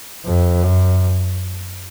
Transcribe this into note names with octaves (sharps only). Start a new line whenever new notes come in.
F2
F#2